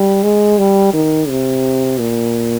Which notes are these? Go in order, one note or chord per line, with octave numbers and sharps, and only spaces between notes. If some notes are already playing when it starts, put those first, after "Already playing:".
Already playing: G3
G#3
G3
D#3
C3
A#2